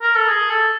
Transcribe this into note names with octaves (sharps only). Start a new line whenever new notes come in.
A#4
A4
G#4
A4